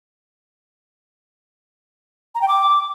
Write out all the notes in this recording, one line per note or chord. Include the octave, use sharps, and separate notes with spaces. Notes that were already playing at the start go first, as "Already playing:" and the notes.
A#5
G5
D6